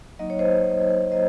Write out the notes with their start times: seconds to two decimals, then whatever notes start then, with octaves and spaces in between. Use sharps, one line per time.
0.19 F#3 A#3 D#4 D#5
0.30 C#5
0.39 C5 D#5
1.12 F#3 A#3 C5 D#5